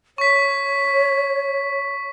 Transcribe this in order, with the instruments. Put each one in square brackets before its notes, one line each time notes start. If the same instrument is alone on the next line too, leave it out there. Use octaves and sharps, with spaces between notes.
[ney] C#5 [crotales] C#6 B6